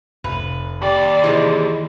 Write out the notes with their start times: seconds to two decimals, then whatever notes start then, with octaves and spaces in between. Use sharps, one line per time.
0.24 F1 B4
0.82 D#2 G4 D5 B5
1.24 C3 E3 G3 G#3